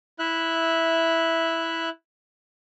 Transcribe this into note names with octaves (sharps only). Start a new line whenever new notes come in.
E4 E5 F#6